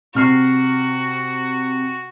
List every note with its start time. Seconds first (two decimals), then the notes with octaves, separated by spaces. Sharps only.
0.15 C3 F#4 F6 C7